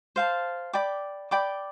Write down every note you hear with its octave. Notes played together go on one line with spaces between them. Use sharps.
C5 F5 A5
D5 G5 B5 D6
D5 G5 B5 D6